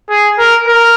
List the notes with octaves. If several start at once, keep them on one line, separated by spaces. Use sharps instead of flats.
G#4
A#4
A#4